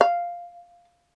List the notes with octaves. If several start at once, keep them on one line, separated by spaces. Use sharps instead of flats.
F5